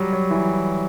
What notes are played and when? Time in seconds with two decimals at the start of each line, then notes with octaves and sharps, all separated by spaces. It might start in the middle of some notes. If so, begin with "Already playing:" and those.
Already playing: F#3 G3
0.13 F#3
0.31 E3